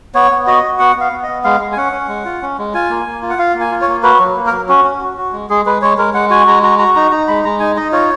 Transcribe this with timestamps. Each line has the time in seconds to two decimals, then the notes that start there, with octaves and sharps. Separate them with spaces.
0.15 B3 C#5
0.31 B3
0.47 F#4 D#5
0.63 F#4
0.79 B3 F#5
0.96 B3 F5
1.12 B3
1.23 B3 D#5
1.44 G#3 F5
1.60 G#3
1.72 G#5
1.77 C#4 F#5
1.92 C#4
2.09 G#3
2.25 F4
2.42 C#4
2.58 G#3
2.74 F4 G#5
2.90 A#3
3.07 A#3
3.22 F4
3.30 F#5
3.38 F4 F5
3.55 A#3
3.60 G#5
3.72 F4
3.82 C#5
3.88 A#3
4.03 F#4 B4
4.20 F#3
4.36 A#3
4.47 A#4
4.52 F#3
4.69 C#4 F#4
4.84 C#4
5.01 F#4
5.17 F#4
5.33 G#3
5.50 G#3 G#4
5.66 G#3 B4
5.82 G#3 C#5
5.98 G#3 A#4
6.14 G#3 F#5
6.30 F#4 G#5
6.47 G#3 A#5
6.63 F#4 A#5
6.79 F#4 A#5
6.96 D#4 A#5
7.11 D#4 A#5
7.28 G#3 B5
7.45 G#3 A#5
7.60 D#4 G#5
7.76 D#4 D#5
7.92 F4 C#5